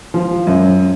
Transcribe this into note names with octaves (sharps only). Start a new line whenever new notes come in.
F3
F#2